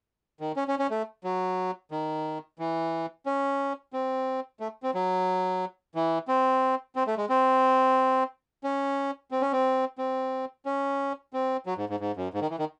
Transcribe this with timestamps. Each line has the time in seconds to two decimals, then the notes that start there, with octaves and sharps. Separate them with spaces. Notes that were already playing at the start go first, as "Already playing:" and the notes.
0.40 D#3
0.56 C#4
0.68 C#4
0.79 C#4
0.91 A3
1.24 F#3
1.91 D#3
2.59 E3
3.26 C#4
3.93 C4
4.60 A3
4.83 C4
4.94 F#3
5.95 E3
6.28 C4
6.96 C4
7.07 A3
7.18 G#3
7.29 C4
8.64 C#4
9.31 C4
9.41 C#4
9.53 C4
9.98 C4
10.66 C#4
11.33 C4
11.66 F#3
11.77 G#2
11.89 G#2
12.00 G#2
12.17 F#2
12.34 G#2
12.41 D#3
12.50 E3
12.59 D#3